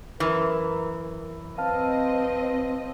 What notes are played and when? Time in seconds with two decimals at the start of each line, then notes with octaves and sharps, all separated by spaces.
0.20 F#2 E3 A#4
1.58 C4 B4 D#5 F5 A5 F6